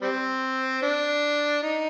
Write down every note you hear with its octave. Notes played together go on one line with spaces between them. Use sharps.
G3 C4
D4
D#4